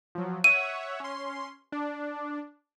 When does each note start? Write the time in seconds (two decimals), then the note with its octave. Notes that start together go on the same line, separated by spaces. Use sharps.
0.15 F3 F#3
0.44 C#5 E5 F#5 D#7
1.00 C#4 C6
1.72 D4